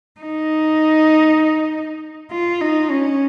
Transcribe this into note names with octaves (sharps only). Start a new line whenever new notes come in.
D#4
F4
D#4
C#4